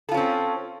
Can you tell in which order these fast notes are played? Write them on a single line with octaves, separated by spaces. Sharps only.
A4 F4 C#4 C4